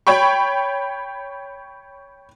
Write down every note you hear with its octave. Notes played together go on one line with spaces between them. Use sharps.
C#5 G5 B5 C#6